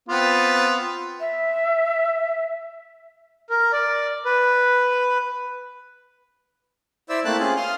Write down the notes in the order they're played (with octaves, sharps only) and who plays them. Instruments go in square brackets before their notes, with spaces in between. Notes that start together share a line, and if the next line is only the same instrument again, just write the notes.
[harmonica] B3 C4 F4
[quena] E5
[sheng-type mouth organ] A#4
D5
B4
E4 C5 D5 E5 E6
A3 A#3 C4 E4 A5 F#6
C4 C#4 F4 G#4
F5 C6 D#6 F6